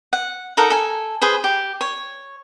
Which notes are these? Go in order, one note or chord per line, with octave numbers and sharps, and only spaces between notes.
F#5
D#4 A4 A#4 F#5
A4 G#5
G#4 B4 C5
G4
C#5